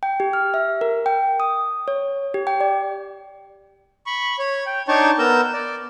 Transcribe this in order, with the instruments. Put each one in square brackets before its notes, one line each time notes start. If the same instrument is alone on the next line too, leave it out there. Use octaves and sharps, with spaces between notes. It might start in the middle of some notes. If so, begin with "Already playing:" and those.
[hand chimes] G5
G4
F6
E5
A#4
G5
D#6
C#5
G4
G5
D5
[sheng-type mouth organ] B5 C#6
C#5
G5
D4 D#4 C#5 G5 A5 C#6
B3 A#4 E6 G6
D5